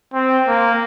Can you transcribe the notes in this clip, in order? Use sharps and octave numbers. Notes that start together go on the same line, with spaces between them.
C4
A#3